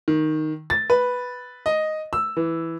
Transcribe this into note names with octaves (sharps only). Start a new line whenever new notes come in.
D#3
A6
B4
D#5
E6
E3